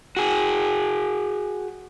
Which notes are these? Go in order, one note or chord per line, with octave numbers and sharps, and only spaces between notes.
F#4 G#4